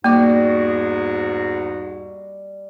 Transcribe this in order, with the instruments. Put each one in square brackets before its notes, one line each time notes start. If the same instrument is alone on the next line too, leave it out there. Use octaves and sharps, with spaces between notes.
[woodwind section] E2 G#2 F#4 [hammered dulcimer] G3 D#5 [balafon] A#3 D6